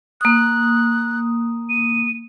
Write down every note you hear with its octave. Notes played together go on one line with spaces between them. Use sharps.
A#3 D#6 F#6
D#7